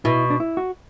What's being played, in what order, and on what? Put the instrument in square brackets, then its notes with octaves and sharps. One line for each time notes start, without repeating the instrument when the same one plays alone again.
[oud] B2 [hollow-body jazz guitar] E4
[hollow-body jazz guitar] D4
E4
F#4